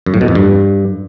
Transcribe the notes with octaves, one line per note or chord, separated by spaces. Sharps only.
F#2
A2
B2
F2
G2